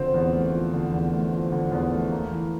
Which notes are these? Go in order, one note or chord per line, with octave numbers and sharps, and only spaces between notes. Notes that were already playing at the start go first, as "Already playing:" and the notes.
Already playing: D3 F3 C4
E2
A3
F3
D3
E2
A3
F3
D3
E2
A3
A#3
E3